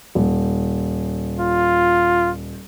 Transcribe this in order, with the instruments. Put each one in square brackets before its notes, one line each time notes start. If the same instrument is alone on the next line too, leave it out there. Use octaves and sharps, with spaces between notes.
[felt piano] D#1
[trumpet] F4